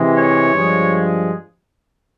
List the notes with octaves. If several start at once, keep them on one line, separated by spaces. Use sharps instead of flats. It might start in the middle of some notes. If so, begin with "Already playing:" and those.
Already playing: C3 E3 G#3
C#5
G2 F3 G#3